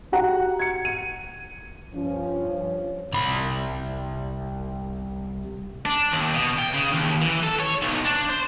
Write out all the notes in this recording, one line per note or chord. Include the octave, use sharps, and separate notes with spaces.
F#4 G4 F#5 A#5
G#6 C#7
D#7
G2 F3 C#4
C2 B5
D4
D#2
B2
G5
C#3
D#2
E3
A4
C#5
B1
D4
C5